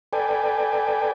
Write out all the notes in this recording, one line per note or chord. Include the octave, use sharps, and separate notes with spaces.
A4 B4 D5 G5 G#5